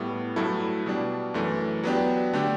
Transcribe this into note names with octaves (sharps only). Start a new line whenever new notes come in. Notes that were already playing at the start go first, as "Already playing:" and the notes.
Already playing: A2 G3 B3
G2 F#3 A3 E4 A4
B2 G3 D4
F#2 E3 A3
F#3 B3 D4 G4
D3 A3 D4 G4